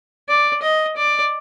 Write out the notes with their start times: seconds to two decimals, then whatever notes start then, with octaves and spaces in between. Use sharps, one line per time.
0.28 D5
0.62 D#5
0.97 D5